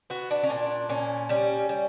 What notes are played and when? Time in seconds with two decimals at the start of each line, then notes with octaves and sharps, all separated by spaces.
0.10 B3 F#4
0.31 D4
0.43 C#4
0.50 A#2 D4
0.89 A#2 C#4
1.29 G3 C#4
1.69 G3